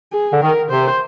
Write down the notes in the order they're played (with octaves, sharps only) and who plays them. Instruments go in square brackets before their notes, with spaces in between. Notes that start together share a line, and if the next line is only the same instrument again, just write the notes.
[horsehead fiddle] G#4
[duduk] D3
[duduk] D#3 [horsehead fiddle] A#4
[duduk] C3 [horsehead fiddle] C5